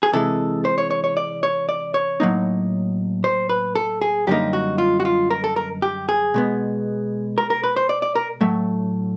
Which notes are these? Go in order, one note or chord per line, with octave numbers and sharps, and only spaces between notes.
G#4
C3 E3 G#3 A4
C5
C#5
C#5
C#5
D5
C#5
D5
C#5
A2 F#3 A#3 D#4
C5
B4
A4
G#4
F#2 D3 G3 A#3 D#4 G4
F#4
F4
F#4
F4
A#4
A4
A#4
G4
G#4
B2 G#3 B3
A#4
A#4
B4
C5
D5
D5
A#4
A2 F#3 A3